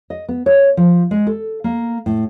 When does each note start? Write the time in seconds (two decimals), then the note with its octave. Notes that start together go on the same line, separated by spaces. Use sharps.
0.10 D#5
0.29 B3
0.46 C#5
0.77 F3
1.11 G#3
1.27 A4
1.64 A#3
2.06 A2